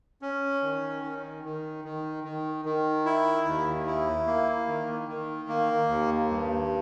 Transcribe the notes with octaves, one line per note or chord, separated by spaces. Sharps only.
C#4
D#3
D#3
D#3
D#3
D#3
D#3
E4
D#2
E4
A#3
D#3
D#3
A#3
D#2
G2